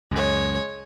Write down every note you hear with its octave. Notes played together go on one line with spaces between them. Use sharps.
C#2 F#2 G#3 C#5